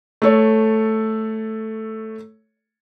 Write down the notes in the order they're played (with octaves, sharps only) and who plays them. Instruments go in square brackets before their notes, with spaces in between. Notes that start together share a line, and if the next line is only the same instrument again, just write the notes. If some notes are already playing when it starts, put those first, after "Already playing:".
[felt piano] A3 A4 C#5